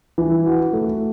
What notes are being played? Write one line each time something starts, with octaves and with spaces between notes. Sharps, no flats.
E3
F#4
A3